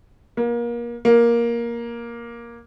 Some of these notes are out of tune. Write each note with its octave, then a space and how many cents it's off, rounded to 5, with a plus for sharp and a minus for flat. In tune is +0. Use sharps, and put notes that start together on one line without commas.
A#3 +30
A#3 +10